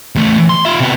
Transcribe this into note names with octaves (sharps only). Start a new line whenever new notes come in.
E2 A3
E3
C6
F4 E5
C3 B3